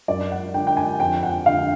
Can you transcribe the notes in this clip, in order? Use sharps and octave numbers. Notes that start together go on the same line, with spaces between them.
F#2 D5
F#5
D3 G5
G5
G#5
F2 G5
F#5
D3 F5